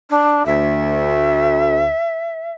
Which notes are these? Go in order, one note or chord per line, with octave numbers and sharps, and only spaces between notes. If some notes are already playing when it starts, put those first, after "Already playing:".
D4
D2 E5